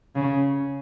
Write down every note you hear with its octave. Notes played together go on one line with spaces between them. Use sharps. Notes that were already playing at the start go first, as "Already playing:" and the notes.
C#3